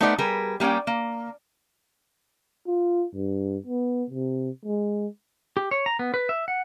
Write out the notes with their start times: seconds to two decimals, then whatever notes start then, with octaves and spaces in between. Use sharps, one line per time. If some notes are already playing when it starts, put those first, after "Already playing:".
0.01 A3 B3 D#4 C5 D5 F#5
0.18 G3 G#4 A#4 B4
0.60 G3 A#3 C#4 D5 G5
0.87 A#3
2.67 F4
3.14 G2
3.66 B3
4.10 C3
4.65 G#3
5.57 G4
5.71 C#5
5.86 A#5
5.99 B3
6.14 B4
6.29 E5
6.48 F#5